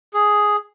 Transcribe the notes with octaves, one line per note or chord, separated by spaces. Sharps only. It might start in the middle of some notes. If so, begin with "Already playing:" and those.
G#4